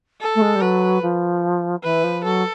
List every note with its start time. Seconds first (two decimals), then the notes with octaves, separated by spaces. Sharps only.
0.21 A4
0.35 A3
0.41 G#3
0.55 G3
0.61 F#3 B4
1.02 F3
1.84 E3 B4
2.04 F3
2.24 F#3 A4